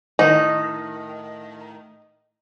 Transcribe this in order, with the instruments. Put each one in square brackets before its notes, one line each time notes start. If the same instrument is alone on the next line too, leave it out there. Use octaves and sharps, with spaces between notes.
[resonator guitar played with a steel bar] A2 D#3 [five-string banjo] D#4